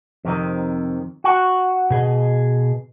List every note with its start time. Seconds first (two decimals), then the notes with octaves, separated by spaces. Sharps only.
0.25 F2 C3 D#3
1.24 F#4
1.91 B2 G#4 D#5